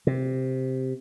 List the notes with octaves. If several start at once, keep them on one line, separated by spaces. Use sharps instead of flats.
C3